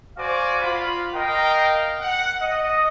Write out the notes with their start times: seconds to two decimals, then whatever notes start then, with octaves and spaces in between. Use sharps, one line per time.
0.17 F#4 C5 D5 F5 G#5 D6
0.61 F4 B5
1.14 A#4 D#5 F5 G5
2.00 F#5
2.41 D#5